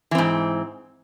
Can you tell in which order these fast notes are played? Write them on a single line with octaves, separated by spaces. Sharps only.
E3 C4 G#2